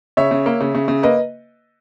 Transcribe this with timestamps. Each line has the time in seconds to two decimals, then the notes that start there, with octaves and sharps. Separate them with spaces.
0.17 C#3 C#5 E5
0.31 C#3
0.46 A#3
0.61 C#3
0.75 C#3
0.88 C#3
1.03 A#3 B4 D#5